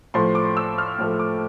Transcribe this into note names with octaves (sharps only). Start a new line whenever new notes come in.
A2 F3 A3 C6
D6
E6
F6
A2 F3 A3
D6